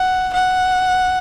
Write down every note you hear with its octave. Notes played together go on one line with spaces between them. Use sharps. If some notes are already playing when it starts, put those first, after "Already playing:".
Already playing: F#5
F#5